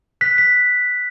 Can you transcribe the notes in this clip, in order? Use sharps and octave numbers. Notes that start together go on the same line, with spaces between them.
F#6 B6
B6